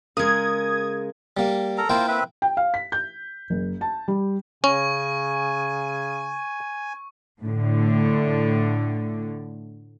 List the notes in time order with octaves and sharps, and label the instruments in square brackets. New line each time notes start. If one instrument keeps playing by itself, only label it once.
[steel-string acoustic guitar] C#3 G#3 [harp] A#4 [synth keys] D#6 G#6
[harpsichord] G3 A#3
[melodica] A4 A#4 A#5
[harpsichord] A#3 E4 G5 [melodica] F4 A#4 C5
[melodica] C4 B4 E5
[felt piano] G5
F5
B6
G6
F#1
A5
G3
[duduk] C#3 [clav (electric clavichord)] C#4 [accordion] G#5 [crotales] C#6
[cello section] A2 D3